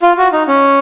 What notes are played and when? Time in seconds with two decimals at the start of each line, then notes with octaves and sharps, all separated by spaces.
0.02 F4
0.18 F#4
0.32 D#4
0.48 C#4